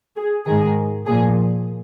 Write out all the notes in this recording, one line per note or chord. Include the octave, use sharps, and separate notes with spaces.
G#4
G#2 D#3 G#4
A#2 F3 G#4